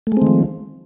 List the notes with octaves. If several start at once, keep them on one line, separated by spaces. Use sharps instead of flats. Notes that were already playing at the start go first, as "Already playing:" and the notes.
D#3 F3 G#3 A3 C4